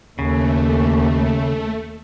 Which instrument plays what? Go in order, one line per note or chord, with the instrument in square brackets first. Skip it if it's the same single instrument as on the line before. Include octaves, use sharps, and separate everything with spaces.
[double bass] D#2 [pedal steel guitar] C#3 [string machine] A3